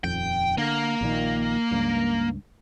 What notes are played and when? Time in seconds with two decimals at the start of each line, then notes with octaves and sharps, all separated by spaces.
0.04 D#1 F2 G5
0.58 D3 A#3
1.01 A#1 A#2 D#3
1.71 C#2 G2